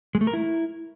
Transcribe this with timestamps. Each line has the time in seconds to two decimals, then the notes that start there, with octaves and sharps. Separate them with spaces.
0.15 G#3
0.21 A3
0.27 A#4
0.33 E4